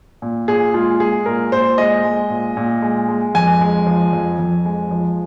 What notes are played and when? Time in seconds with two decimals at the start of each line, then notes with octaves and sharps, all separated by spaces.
0.22 A#2
0.48 A#2 G#4
0.74 G#3 F4
1.00 G#3 G#4
1.26 A#2 A#4
1.52 A#2 C5
1.78 G#3 D#5
2.04 G#3
2.30 A#2
2.57 A#2
2.82 G#3
3.09 G#3
3.35 F2 G#5
3.61 G#3
3.87 F3
4.13 F2
4.39 F2
4.65 G#3
4.91 F3